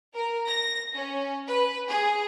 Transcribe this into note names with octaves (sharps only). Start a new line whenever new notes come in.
A#4
A#6
C#4
B4
G#4